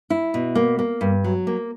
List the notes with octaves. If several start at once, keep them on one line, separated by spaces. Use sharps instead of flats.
E4
B2
A#3
A#3
G2
F#3
A#3